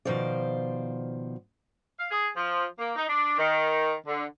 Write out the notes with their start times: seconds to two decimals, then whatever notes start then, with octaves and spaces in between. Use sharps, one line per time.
0.05 B2 D#3 F3 C5 D5
1.98 F5
2.10 G#4
2.36 F3
2.78 A#3
2.96 D#4
3.09 D4
3.38 D#3
4.06 D3